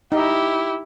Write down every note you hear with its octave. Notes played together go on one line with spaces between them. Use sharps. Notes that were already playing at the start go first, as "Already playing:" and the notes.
D#4 E4 G4